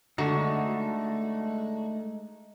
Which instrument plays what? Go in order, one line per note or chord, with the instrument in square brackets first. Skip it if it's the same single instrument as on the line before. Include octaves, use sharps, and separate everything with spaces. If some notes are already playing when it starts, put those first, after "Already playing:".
[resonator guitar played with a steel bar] D3 F#4 [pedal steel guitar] G#3 A3 D#4